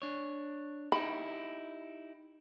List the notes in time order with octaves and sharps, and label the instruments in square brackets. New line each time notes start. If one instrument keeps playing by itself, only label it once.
[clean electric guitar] D4 C#5
[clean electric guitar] D#4 E4 G4 [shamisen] B5